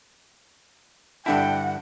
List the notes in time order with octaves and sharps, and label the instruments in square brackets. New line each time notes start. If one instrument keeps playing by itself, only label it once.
[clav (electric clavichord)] G2 D3 E4 [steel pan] D4 A5 [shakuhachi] F#5 [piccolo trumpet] G5